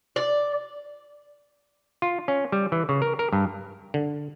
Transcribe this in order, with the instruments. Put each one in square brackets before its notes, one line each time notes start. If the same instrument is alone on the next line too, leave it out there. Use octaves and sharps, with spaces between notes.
[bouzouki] D5
[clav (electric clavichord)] F4
C#4
G3
E3
C#3
A#4
A#4
G2
D3